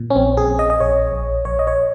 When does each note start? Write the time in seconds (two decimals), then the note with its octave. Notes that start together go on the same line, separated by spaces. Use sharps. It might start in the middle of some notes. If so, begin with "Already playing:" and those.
Already playing: A#2
0.10 C#4
0.15 A#1 C4
0.37 G#4
0.48 A#1
0.59 D#5
0.70 D#5
0.80 A#1 C#5
1.12 A#1
1.45 A#1 C#5
1.59 D#5
1.67 C#5